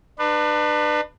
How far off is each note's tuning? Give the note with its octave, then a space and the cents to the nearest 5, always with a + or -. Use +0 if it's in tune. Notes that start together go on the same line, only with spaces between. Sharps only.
D4 +35 B4 +0